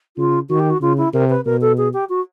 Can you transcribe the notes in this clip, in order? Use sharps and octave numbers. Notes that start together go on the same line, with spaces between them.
C#3 F4
D#3 F#4
G4
F#4
C#3 F4
E4
C3 A#4
B4
B2 A#4
A4
G#4
G4
F#4